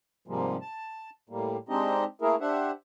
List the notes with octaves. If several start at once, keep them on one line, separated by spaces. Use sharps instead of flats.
G#2 C3 F3 G3 G#3 A#3
A5
A2 G3 A#3
G#3 C4 D4 D#4 G4 D#5
A3 A#3 E4 G#4 A#4
D4 G4 C5 E5 F#5